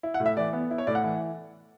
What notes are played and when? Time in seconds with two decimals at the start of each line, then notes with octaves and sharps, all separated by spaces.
0.03 E4
0.14 F#5
0.20 A2
0.26 E5
0.37 E3 D5
0.53 B3
0.71 E4
0.78 C#5
0.87 A2 D5
0.95 F#5
1.04 E3